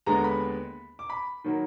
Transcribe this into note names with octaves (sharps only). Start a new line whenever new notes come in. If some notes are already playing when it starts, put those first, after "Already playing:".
D#2 D3 G#3 B3 A#5
B5
D6
B5
D#3 F#3 A#3